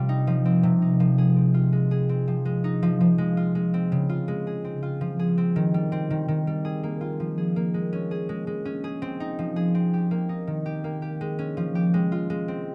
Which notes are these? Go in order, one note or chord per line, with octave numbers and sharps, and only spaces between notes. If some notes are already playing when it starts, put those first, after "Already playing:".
Already playing: C3 G3 C4 F4
D#4
F3
C4
C3
D#4
F3
G#4
C4
F4
G#3
G#4
C4
F3
G#3
D#4
F3
F3
G#3
F4
G#3
C4
C#3
F4
G#3
G#4
C4
F4
F3
G#4
C4
D#3
G3
C4
D#3
D#3
G3
G#4
A#3
F4
F3
G#4
A#3
G#3
C#4
G#4
G#3
G#3
C#4
G#4
C4
D#4
F3
G#4
C4
G4
A#3
D#4
D#3
G4
A#3
G4
G#3
C#4
F3
G4
G#3
F4
G#3
C4